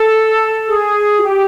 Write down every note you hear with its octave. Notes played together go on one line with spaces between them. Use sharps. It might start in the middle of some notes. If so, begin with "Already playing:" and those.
Already playing: A4
G#4
F#4
G4